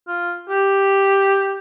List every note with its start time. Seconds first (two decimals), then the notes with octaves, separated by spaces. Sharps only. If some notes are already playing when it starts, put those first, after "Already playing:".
0.07 F4
0.49 G4